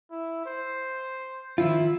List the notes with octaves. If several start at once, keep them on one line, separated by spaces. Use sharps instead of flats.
E4
C5
D#3 F3 E4 F4